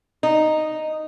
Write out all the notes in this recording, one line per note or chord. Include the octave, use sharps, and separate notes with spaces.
D#4